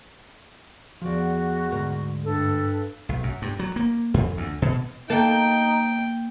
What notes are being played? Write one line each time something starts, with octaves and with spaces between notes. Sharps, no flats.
E2 F3 F#4 D5
D2 G#2 A#4
G2 A4
B1
F#2
G2
F#3
A#3
F2
D2
B2
A#3 D#4 G5 A5